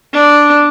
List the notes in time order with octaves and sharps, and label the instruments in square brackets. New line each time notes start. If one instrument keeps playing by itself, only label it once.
[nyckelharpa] D4